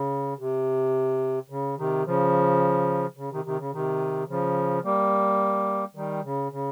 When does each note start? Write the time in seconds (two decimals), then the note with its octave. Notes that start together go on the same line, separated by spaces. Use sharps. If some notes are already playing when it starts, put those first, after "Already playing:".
Already playing: C#3
0.39 C3
1.50 C#3
1.78 C3 D#3
2.06 C#3 F3
3.17 C#3
3.32 C3 D#3
3.45 C3 D#3
3.59 C#3
3.73 C3 D#3
4.29 C#3 F3
4.84 G3 A#3
5.95 D#3 G3
6.24 C#3
6.52 C#3